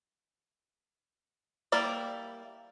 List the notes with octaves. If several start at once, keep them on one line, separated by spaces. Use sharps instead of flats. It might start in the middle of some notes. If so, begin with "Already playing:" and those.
G3 A#3 E4 D5